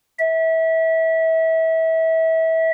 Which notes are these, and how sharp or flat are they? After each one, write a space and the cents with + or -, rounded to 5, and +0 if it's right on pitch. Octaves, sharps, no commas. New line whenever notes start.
E5 -25